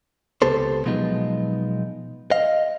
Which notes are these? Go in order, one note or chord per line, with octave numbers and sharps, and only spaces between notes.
C#2 C3 B3 G4 A4 C5
B2 F3 F#3 G#3 B3 D#4
D#5 F5